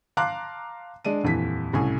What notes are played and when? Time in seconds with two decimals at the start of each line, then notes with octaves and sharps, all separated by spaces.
0.17 F5 A5 A#5 C6 D6 F#6
1.05 G#3 D4 D#7
1.24 D#1 F2 E3 B6
1.73 C2 A2 C#3 G#5